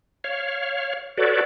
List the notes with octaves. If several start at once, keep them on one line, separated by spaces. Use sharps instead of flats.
C#5 F5
F#4 A4 B4 C#5 D5